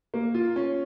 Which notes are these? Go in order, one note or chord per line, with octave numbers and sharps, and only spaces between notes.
A#3
F4
C#4